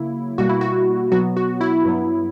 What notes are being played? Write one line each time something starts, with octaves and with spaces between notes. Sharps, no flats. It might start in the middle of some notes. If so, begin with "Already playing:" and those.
Already playing: C#3 F#3 A#3 E4
B2 G3 A#3 F#4
E4
F#4
B2 F#3 B3 F#4
F#4
E4
G2 F#3 B3